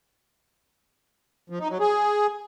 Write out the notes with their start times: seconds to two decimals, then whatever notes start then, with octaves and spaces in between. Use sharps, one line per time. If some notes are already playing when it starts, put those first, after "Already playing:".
1.50 F3
1.60 D#4
1.70 F#3
1.80 G#4